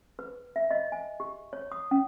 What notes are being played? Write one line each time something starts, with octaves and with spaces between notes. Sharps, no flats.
B4
E5
D#5
G#5
G4
C#5
D#6
C#4